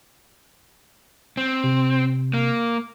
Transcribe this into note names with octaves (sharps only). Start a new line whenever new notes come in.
C4
C3
A#3